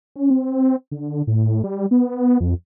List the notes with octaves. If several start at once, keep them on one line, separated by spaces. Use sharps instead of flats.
C#4
C4
D3
A2
G3
B3
F2